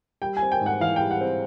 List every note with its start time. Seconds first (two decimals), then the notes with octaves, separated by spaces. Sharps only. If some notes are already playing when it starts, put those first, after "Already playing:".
0.22 G3 G5
0.37 G#5
0.42 C4
0.52 G5
0.61 G#2
0.66 F#5
0.80 E3 F5
0.96 G3 G5
1.11 F#5
1.21 C4